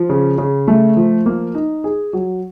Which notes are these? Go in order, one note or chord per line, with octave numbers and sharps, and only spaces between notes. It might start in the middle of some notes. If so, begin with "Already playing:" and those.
Already playing: F3
C#3
C#3
A3
F3
A#3
D#4
G#4
F#3